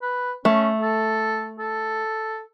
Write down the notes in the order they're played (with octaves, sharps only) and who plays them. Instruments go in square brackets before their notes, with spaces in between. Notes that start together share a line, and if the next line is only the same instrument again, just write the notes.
[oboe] B4
[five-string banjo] A3 [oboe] C#4
[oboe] A4
A4